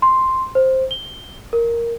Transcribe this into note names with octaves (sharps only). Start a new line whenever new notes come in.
C6
C5
G7
A#4